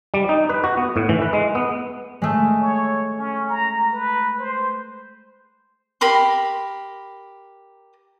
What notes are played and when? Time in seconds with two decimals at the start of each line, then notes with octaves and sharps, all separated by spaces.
0.14 G3
0.29 D#4
0.49 B4
0.64 F#4
0.77 B3
0.96 A2
1.09 E3
1.22 B4
1.33 G#3
1.55 B3
2.22 G#3 A3
2.60 C#5
3.19 C#4
3.49 A#5
3.93 B4
4.40 C5
6.01 G4 A#4 B5 C6